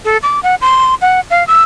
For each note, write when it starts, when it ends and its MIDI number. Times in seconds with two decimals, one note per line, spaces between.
0.05 0.17 69
0.23 0.40 86
0.43 0.55 78
0.61 0.95 84
1.01 1.20 78
1.30 1.46 77
1.47 1.63 88